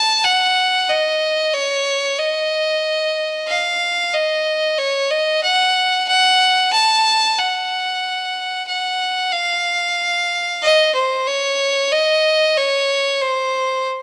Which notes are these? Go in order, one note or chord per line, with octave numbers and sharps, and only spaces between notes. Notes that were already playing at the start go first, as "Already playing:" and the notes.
Already playing: A5
F#5
D#5
C#5
D#5
F5
D#5
C#5
D#5
F#5
F#5
A5
F#5
F#5
F5
D#5
C5
C#5
D#5
C#5
C5